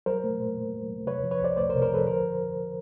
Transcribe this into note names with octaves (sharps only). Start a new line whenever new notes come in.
F#3 A#4 C5
A3
A#2
A#2
F#3
A3
C3 B4 C#5
F3
B4 C#5
C2 C5 D5
A3 C5 D5
A#4 C5
C3
A#4 C5
F3 A4 B4
D3 A#4 C5